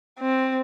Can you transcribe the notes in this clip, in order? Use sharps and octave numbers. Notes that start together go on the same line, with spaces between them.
C4